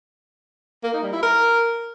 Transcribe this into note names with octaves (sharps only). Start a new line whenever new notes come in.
A#3
D#4
G3
E4
A#4